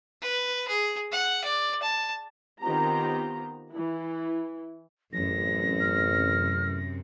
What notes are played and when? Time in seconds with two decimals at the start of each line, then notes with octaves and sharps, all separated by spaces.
0.22 B4
0.68 G#4
1.12 F#5
1.44 D5
1.83 A5
2.61 D#3 B3 C4 F4 G4 A#5
3.72 E3 E4
5.13 A1 F#2 C3 A#6
5.80 F6